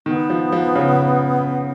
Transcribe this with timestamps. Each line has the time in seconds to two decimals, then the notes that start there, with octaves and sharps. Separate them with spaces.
0.06 D#3 B3
0.30 F3
0.52 F3
0.75 C#3